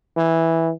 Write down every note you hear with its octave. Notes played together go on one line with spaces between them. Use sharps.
E3